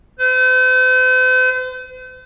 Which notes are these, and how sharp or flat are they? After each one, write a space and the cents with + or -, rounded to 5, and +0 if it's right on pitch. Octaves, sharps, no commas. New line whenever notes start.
C5 -45